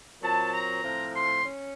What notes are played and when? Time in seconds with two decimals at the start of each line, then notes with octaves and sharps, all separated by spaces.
0.23 A#2 F#3 C4 A5
0.54 A#5
0.84 A2 F3 C4
1.14 C6
1.45 C#4